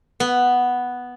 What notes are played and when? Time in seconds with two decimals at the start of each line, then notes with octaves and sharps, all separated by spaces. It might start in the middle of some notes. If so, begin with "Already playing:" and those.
0.20 B3